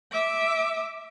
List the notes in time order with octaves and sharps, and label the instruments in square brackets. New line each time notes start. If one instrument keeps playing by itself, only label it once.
[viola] E5 D6